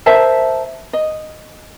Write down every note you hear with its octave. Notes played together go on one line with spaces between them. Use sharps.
A#4 C5 E5 A5
D#5